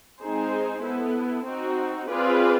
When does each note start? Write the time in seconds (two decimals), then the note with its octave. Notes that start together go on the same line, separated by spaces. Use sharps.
0.20 G#3 C4 D#4 G#4 C5
0.83 B3 E4 A4
1.46 C4 D#4 F#4
2.09 C4 F4 G#4 B4 D5